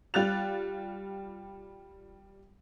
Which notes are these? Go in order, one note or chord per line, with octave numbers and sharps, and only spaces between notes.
G3 F4 F#6 A6 F7